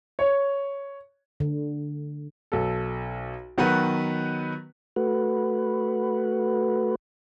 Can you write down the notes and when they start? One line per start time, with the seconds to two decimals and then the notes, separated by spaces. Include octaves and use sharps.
0.19 C#5
1.40 D3
2.52 B1 A4
3.58 D#3 F#3 B3 F#4 B4
4.96 A3 F#4 B4